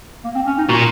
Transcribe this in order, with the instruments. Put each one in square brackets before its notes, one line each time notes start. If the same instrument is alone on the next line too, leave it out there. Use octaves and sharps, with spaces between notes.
[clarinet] A#3
C4
C#4
D#4
[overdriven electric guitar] A#2 [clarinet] F#4